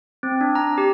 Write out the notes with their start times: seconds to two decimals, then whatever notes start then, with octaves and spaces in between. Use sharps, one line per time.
0.23 C4
0.41 D4
0.55 A#5
0.78 G4